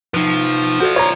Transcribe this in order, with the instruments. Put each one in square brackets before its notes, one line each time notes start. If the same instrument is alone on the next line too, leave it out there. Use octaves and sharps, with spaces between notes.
[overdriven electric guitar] F3 [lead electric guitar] D#4 B4
[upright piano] F#4 A4 [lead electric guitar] C5 D5
[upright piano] C#5 A#5